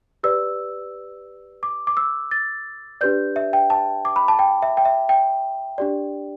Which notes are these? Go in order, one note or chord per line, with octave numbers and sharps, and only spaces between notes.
G4 B4 D5 E6
D6
D6
E6
A6
D4 G4 B4 D5 G6
E5
G5
A5
D6
B5
A5
G5
E5
G5
E5
G5
D4 G4 D5